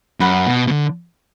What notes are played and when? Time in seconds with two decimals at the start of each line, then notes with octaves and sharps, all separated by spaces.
0.20 F#2 F#5 B5
0.46 B2
0.67 B2
0.71 D3